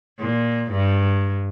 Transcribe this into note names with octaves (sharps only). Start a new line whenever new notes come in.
A#2
G2